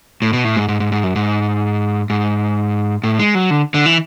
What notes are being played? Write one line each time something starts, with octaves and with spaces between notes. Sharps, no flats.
A2
B2
A2
G#2
G#2
G#2
G#2
F#2
G#2
G#2
A2
G#3
F#3
D3
D3
E3